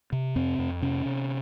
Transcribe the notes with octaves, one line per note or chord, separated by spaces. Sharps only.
C3
F2 C4
F2
C3 C#4
C3